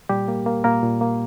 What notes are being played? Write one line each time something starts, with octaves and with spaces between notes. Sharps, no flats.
A#2 G3 G4
A#3
A#3
A#2 A#3 A#4
A#2
A#3